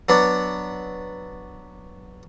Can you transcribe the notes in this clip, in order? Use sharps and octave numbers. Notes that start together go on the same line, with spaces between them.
F#3 B3 D4